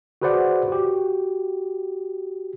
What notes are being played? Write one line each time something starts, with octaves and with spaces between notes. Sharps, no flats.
F#4 G#4 B4 C5 D5 F#5
F#4 G4